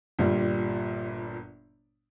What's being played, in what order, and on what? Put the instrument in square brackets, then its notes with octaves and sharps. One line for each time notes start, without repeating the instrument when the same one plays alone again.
[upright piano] G1 A#2 G3